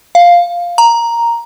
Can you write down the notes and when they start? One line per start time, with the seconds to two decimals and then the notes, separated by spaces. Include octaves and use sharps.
0.15 F5
0.78 A#5